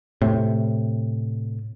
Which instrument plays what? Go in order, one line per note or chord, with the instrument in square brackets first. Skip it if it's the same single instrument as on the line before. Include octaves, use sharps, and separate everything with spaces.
[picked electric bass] A2 C3